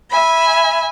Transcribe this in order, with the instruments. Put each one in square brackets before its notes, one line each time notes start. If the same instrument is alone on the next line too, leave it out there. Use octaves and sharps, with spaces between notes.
[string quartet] E5 G#5 B5